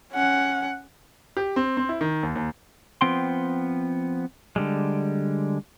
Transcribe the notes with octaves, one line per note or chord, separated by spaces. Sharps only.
C#4 F#5
G4
C4
C4
E4
D#3
D#2
D#2
F3 B3 C4 G5 C6
D3 G3 G#3